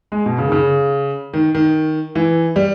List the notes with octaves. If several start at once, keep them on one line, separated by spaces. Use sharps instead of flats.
G#3
B2
C#3
D#3
C#3
D#3
D#3
E3
G3